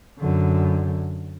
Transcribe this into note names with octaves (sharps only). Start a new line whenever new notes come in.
F#2 D3